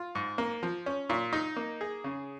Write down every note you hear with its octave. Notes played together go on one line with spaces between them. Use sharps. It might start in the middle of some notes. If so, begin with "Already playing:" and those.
Already playing: F4
G#2
A#3
F3
C#4
A#2
D#4
A#3
G#4
C#3